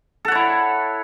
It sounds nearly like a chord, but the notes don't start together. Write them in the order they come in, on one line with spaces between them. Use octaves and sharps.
A4 F#5 C#5 E4